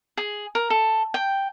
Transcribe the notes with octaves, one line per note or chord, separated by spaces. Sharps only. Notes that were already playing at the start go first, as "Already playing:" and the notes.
G#4
A#4
A4
G5